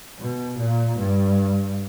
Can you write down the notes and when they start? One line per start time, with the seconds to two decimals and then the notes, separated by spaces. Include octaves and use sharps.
0.19 B2
0.59 A#2
0.99 G2